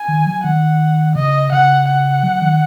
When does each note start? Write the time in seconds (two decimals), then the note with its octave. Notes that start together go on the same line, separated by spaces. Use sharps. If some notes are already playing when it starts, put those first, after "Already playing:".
Already playing: G#5
0.08 D#3
0.26 F#3
0.44 D#3 F#5
1.16 C#3 D#5
1.52 C#3 F#5
1.88 F#5
2.23 F#3
2.42 D#3